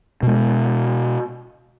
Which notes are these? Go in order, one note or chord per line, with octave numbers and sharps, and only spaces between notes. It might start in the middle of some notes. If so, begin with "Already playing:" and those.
B2 G#3